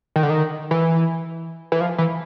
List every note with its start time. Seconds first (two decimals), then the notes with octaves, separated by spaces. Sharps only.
0.16 D#3
0.23 D3
0.30 D#3
0.71 E3
1.72 E3
1.81 F3
1.98 E3